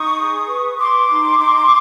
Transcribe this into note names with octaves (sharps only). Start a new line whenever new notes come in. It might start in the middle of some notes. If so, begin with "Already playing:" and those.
Already playing: D#4 C#6 D#6
G#4
B4
B4 C6 D6
D#4
D#4